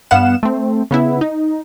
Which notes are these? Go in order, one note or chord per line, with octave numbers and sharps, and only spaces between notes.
G2 B3 F5 F#5 E7
A3 C4
C#3 B3 E4
D#4